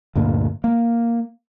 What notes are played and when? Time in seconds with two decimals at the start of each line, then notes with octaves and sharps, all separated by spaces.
0.15 D2 G2 A#2 A#3
0.64 A#3